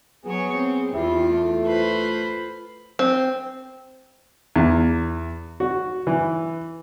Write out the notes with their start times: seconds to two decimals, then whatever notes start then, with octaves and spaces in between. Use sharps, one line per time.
0.25 F#3 B3 G#4 C#5
0.54 C4
0.93 E2 E4 F4 G4
1.29 A3
1.64 F4 B4 C5
2.99 C4
4.56 E2
5.60 F#4
6.07 E3